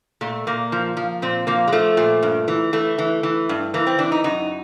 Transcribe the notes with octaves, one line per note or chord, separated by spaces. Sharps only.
A#2 A3
A#2 A#3
F3
F3
A#2 C4
F3 A#3
G#3
F3 A3
A#2
G2
E3
E3 A3
E3
E3
G2
E3 A#3
C4
E3 D4
D#4
F#2 D#4